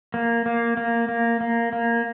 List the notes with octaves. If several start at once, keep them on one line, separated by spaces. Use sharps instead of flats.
A#3
A#3
A#3
A#3
A#3
A#3